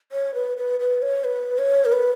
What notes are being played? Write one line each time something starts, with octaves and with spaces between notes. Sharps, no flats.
C#5
B4
B4
B4
C#5
B4
C#5
A#4
B4